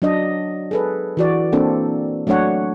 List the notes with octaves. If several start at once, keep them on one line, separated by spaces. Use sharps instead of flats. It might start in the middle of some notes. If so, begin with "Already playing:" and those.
F#3 D4 D#5
G#4 A4 B4
E3 F#4 D5
A#3 C4 D4 A4
F#3 A3 D4 C#5 F#5